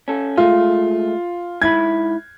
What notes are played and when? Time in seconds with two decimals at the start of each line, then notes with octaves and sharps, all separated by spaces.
0.08 C#4 A4
0.38 G#3 A3 F4
1.62 G#2 E4 B5 G#6